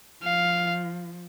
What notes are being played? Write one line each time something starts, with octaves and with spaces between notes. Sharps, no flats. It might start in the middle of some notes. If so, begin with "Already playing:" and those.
F3 F5